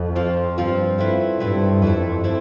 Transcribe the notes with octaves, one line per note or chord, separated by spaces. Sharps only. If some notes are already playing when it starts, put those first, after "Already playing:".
Already playing: F2
F3 C4 F4
G2 F3 C4 F4
A3 C4 E4 B4
G2 A3 C4 E4 B4
F2 A3 C4 E4 B4
A3 C4 E4